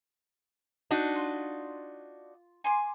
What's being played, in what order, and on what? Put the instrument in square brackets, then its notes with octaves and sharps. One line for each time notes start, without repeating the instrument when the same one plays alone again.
[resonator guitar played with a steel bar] D4 D#4 F#4
[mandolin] F4
G#5 C6 D6